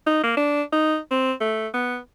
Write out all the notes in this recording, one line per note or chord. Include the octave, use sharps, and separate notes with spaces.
D#4
A#3
D4
D#4
C4
A3
B3